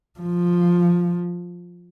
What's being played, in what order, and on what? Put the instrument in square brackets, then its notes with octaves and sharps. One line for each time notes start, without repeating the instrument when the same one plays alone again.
[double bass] F3